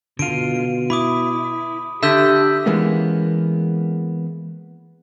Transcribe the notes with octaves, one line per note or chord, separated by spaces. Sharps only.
B2 D3 F4 D7 D#7
E4 B5 D6 D#6
D3 G4 E5 E6 G6 B6
E3 G#3 A#3 B3 C#4